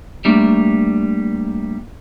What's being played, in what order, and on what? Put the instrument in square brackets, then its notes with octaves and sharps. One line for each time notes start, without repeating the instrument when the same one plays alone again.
[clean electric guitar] G3 A3 A#3 D4